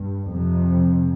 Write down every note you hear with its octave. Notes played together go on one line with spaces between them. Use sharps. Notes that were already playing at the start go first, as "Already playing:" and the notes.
Already playing: G2
F2 C3